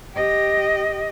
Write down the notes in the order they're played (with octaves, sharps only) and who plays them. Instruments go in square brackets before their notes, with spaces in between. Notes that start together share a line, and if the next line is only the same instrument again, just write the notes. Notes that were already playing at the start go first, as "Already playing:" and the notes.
[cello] G4 D#5